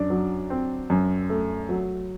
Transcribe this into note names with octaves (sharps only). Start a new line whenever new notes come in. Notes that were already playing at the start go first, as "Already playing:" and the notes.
Already playing: F#2 D4 D5
F#3
C4
F#2
A3
F#3